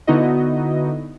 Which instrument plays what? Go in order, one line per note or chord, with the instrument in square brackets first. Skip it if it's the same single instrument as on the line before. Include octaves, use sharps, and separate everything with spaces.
[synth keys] D3 B3 D#4 E4 F#4 D#5